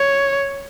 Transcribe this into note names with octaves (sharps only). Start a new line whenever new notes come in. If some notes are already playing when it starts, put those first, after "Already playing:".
Already playing: C#5